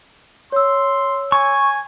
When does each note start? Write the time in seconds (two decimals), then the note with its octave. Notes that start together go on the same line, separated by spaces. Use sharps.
0.52 C#5 C6 E6
1.32 G#5 C#6